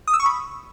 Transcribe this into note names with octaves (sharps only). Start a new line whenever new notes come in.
D#6
E6
C#6
B5